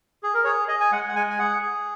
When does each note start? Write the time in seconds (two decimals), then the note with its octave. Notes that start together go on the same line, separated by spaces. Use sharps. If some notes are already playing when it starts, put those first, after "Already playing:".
0.23 G#4
0.34 A#4
0.44 G#4 C#5
0.68 G#4 D#5
0.81 G#5
0.92 G#3 F#5
1.09 F#5
1.16 G#3 G#5
1.30 G#5
1.39 G#4 F#5
1.62 G#4